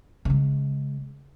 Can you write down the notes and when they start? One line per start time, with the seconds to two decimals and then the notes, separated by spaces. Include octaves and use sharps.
0.25 C#3 G#3